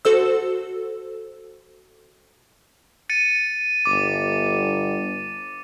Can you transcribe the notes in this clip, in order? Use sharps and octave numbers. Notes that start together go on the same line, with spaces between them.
F#4 A4 C5 E6
A6 C#7 D#7
G1 D6